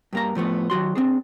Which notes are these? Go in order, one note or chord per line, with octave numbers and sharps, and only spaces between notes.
G2 A#3 A#5
A2 F3 A3 B3
D#3 F#3 F#4 C6
C4 D4 G#4